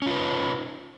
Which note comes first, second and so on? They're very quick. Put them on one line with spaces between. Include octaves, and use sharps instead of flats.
C#4 F4 B4 D#4